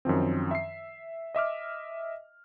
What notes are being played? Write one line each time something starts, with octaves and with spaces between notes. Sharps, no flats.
F#2 D#3 F3 C4
E5 C7
D#5 E5 D6 F6